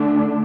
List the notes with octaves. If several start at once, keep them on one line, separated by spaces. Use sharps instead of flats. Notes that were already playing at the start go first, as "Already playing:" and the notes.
Already playing: D3 A3 D4